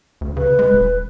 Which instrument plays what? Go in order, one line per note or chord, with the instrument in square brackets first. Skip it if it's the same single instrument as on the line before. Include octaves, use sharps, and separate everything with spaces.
[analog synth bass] D2
[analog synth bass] C#3 [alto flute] B4
[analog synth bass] G#3
D#1